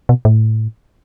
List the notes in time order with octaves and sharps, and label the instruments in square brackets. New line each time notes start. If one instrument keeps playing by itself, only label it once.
[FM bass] B2
A2